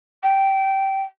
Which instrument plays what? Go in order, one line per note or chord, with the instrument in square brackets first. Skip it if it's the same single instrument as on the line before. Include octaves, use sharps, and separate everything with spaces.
[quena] G5